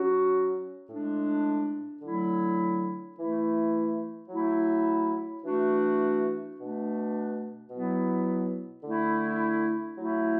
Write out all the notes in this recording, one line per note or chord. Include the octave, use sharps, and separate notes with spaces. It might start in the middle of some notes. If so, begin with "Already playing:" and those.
Already playing: F#3 C#4 F#4
A2 G#3 D4
D3 F#3 A3 E4
E3 A3 E4
F#3 A3 E4
E3 A3 D4 F#4
B2 A3 D4
B2 F#3 B3 E4
D3 A3 E4
F#3 A3 E4